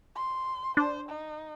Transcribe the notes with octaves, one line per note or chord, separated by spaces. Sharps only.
C6
D4 C5
D#4